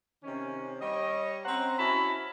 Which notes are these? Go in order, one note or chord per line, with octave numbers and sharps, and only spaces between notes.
C3 D#3 C#4
G3 C#5 D#5
C4 C#4 C5 F#5 A#5
C#4 E4 F#4 A5 B5